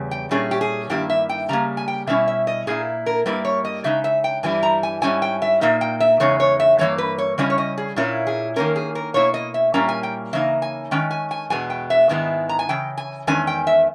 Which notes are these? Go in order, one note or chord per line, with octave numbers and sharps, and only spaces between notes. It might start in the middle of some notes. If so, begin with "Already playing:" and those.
Already playing: E2 C#3 G3
G5
A#2 G3 C#4 E4 G#4
G4
G#4
G2 D#3 A#3 E4 G4
E5
G5
C#3 G3 A#3 A#5
G#5
G5
B2 G3 C#4 E4 E5
E5
D#5
A#2 A#3 E4 G#4
A#4
G2 G3 A#3 E4 B4
C#5
D#5
C#3 G#3 D#4 E5
E5
G5
G2 E3 G3 E4 G#5
A#5
G#5
G#2 G3 C#4 E4 G#5
G5
E5
A#2 A#3 D#4 E5
G5
E5
E2 C#3 G#3 D#4 C#5
C#5
E5
G2 E3 A#3 C#5
B4
C#5
C#3 G3 C#4 E4 D#5
C#5
D#5
G#4
A#2 A#3 C#4 E4
G#4
D#3 A#3 C#4 A#4
G#4
A#4
B2 A#3 E4 C#5
D#5
E5
A#2 G3 A#3 C#4 E4 A#5
G#5
G5
C#3 E3 A#3 D#4 E5
G#5
D#3 G#3 C#4 G5
G#5
G#5
E2 B2 G#3 B3 G#5
G5
E5
G#2 D#3 G#3 B3 E4
A#5
G#5
C#3 E3 G5
G#5
E2 D#3 G#3 C#4 G#5
G5
E5